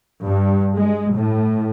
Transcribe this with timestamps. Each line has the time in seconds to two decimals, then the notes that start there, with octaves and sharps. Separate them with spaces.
0.25 G2
0.77 G#3
1.14 A2